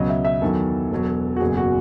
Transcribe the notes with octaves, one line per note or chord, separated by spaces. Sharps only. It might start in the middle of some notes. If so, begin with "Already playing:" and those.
Already playing: C#2 B2 F#3 D#5
E5
E5
E2 D#3 F#3 A4
E1 E2 B2 F#3
F#4
F#1 E2 B2 F#3 G#4
F#4